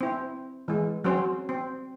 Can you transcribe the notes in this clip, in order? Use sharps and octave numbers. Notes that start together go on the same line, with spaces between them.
C4 E4
E3 G#3
F#3 C4 C#4 C5
C4